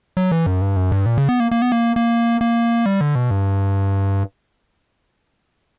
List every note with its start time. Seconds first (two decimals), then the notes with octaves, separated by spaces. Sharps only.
0.17 F#3
0.31 E3
0.46 F#2
0.61 G2
0.76 F#2
0.92 G2
1.06 A#2
1.18 C#3
1.29 B3
1.40 A#3
1.51 A#3
1.62 B3
1.72 A#3
1.96 A#3
2.41 A#3
2.86 G3
3.01 D3
3.15 B2
3.31 G2